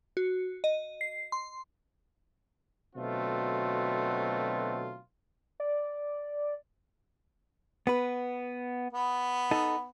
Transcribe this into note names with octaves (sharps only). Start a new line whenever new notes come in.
F#4
D#5
C7
C6
B2 D3 F#3 A3 C4 F4
D5
B3 B4
B3
D#4 A4